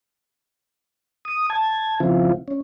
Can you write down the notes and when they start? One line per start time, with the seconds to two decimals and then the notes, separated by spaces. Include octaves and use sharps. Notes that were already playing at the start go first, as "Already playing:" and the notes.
1.25 D#6
1.50 A5 G#6
2.00 C#3 F3 C4 E4 F4
2.48 C#4